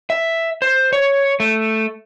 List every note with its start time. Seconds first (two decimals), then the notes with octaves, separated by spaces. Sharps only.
0.10 E5
0.62 C5
0.93 C#5
1.40 A3